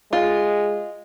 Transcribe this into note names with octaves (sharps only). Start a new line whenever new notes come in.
G#3 F4